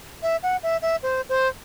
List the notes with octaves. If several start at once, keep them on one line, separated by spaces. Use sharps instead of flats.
E5
F#5
E5
E5
C5
C5